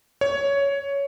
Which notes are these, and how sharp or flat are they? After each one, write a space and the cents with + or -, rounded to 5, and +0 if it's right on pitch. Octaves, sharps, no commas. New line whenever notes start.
C#5 +10